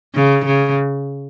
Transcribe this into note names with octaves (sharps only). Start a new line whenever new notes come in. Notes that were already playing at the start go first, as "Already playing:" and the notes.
C#3
C#3